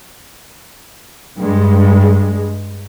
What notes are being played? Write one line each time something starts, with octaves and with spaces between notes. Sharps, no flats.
G2 G#3